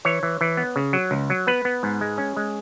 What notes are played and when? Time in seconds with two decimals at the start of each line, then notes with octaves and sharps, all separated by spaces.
0.05 E3 C#5
0.23 E3
0.41 E3
0.57 B3
0.76 C#3
0.93 F#3
1.11 C#2
1.30 F#3
1.47 B3 B4
1.65 B3
1.83 G#2
2.01 G#3
2.18 C#4
2.37 G#3